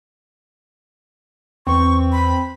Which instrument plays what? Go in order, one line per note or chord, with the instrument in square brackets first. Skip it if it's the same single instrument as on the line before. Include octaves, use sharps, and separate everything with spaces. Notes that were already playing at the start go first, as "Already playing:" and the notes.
[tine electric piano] E2 B4 [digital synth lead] C4 [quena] C#6
[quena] B5